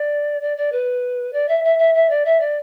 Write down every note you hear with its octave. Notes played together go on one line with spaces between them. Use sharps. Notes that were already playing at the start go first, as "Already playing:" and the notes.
Already playing: D5
D5
D5
B4
D5
E5
E5
E5
E5
D5
E5
D5